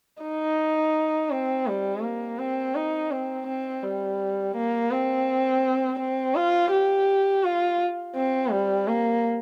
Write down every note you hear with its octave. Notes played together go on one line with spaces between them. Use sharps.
D#4
C4
G3
A#3
C4
D#4
C4
C4
G3
A#3
C4
C4
F4
G4
F4
C4
G3
A#3